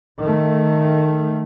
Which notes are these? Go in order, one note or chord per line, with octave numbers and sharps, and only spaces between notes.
D#3 A3